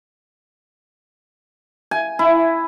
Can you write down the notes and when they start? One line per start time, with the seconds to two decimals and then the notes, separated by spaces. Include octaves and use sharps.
1.91 G#5
2.19 E4